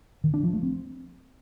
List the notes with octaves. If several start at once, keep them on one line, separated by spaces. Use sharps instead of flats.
D#3
D4
F3
A3
C4